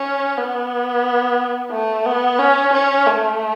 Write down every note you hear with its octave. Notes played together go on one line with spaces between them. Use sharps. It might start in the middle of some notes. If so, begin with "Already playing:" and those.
Already playing: C#4
B3
A3
B3
C#4
C#4
A3